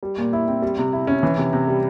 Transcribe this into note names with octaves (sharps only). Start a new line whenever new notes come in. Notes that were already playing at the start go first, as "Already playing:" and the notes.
G3
A#2
E4
C4
G3
C3
E4
C#4
E3
C3
C3
G3